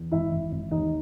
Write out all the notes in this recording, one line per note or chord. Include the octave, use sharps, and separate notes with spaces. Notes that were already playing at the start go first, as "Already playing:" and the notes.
Already playing: E2
G#1 E4 E5
G#1
G#1
D#2 D#4 D#5